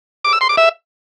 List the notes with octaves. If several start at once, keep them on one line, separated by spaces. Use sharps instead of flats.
D6
E6
C6
D6
E5